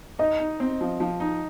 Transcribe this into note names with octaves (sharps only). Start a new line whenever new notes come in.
D#4 D#5
D#4
C4
F3
F3
D#4